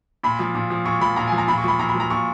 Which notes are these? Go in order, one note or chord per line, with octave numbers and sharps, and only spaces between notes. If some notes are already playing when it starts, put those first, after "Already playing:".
A#2 B5
F3
A#2
F3
A#2 C#6
F3 B5
A#2 A#5
G#5
F3
A#5
A#2 B5
C#6
F3 B5
A#2 A#5
B5
F3
A#5
A#2 C#6